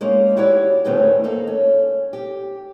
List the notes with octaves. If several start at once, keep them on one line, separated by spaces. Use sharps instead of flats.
G#3 A#3 C#4 D#4 F4
E4 F#4 G4 C#5 D5
D2 A2 D#3 B3 C#4 G#4
A#3 D#4 A4
C#4
G4